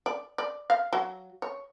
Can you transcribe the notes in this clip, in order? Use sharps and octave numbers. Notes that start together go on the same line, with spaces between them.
D5
D5
F5
F#3
C#5